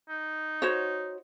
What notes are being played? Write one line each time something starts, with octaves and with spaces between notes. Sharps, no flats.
D#4
F#4 C5 C#5